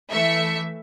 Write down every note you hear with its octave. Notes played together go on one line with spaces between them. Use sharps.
E3 A3 E5 C#7